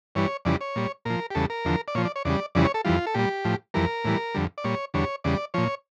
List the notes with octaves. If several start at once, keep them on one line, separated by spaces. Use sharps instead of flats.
G2 E3 G3 C#5
F2 C#3 E3 G3 D5
C#5
A#2 G3
A#2 F3 A#4
G4
E2 C#3 G3 A4
A#4
E2 D3 F3
D5
A#2 F3 C#5
D5
C#5
E2 C#3 G3 D5
F2 C#3 E3 G3 D5
C#5
A4
F2 E3 G3 F4
A4
A#2 G3 G4
A2 F3
F2 E3 G3 A#4
A2 E3 G3
F2 D3 G3
D5
A#2 G3 C#5
E2 D3 G3 C#5
E2 C#3 G3 D5
A#2 F3 C#5